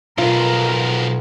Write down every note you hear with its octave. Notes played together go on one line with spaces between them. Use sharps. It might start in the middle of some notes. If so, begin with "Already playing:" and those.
B1 F2 B2 F4 A#4